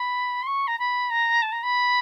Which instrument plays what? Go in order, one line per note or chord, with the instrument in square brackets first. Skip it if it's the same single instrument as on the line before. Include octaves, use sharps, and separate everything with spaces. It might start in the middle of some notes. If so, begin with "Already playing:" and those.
Already playing: [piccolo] B5
C6
C#6
A#5
B5
A#5
A5
A#5
B5